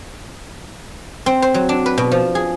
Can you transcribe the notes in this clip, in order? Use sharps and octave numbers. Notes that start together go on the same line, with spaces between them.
C4
C5
F#3
D4
B4
B2
F3
G#4